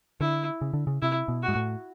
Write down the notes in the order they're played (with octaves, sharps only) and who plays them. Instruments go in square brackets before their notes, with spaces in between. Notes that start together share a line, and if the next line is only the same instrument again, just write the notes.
[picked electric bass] D3 [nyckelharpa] E4
[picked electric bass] C#3
D3
C#3
[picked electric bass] C3 [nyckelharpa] E4
[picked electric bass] B2
[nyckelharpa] F#4
[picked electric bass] G#2
A2